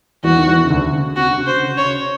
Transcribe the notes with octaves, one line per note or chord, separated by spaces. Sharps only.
E2 E3 F#4
D#3
E2 E3
C#3
D2 D3
C#3
C3 F#4
D3
C#3
C5
C#3
C#5
C#3